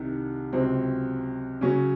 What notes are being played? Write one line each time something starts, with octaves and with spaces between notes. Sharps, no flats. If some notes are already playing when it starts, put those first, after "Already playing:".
Already playing: C2 C3 D#3
C#2 C3 F#3 C4
C#3 F#3 C#4 F#4